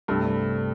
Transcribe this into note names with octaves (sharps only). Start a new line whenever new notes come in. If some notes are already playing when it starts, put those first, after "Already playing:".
C2 G2 C3 A3 C4 A4